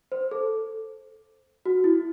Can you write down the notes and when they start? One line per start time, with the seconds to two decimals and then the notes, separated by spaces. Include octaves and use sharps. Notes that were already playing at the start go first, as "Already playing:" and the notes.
0.12 C5
0.31 A4
1.66 F#4
1.84 E4